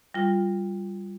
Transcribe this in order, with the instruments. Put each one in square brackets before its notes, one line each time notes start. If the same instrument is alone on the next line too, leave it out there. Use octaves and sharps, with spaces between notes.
[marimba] G3 F4